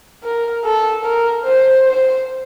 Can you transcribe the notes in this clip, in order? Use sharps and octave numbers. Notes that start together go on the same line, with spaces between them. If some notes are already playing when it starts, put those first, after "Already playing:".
A#4
A4
A#4
C5
C5